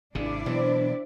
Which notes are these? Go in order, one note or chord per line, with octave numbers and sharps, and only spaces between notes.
G#1 C3 D4 E4 G#4 D5
B2 E3 F#3 C4